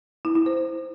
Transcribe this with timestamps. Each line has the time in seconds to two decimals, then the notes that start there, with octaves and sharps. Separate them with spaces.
0.25 E4
0.36 E4
0.46 C5